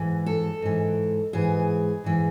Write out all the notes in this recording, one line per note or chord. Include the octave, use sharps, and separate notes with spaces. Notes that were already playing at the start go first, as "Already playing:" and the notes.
Already playing: G#2 E3
A4
G#2 E3
G#2 E3 G#4
G#2 E3